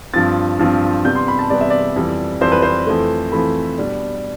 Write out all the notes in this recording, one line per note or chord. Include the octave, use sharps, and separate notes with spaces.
G2 F3 C4 A6
G2 F3 C4
C3 G3 B3 G6
C6
B5
A5
C3 G3 B3 D5
E5
D5
F2 E3 G3
F2 E3 G3 C5
B4
C5
F2 E3 A3
F2 E3 A3 B5
B2 G3 D4